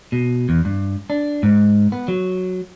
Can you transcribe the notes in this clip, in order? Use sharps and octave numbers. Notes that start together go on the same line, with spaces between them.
B2
E2
G2
D4
G#2
B3
F#3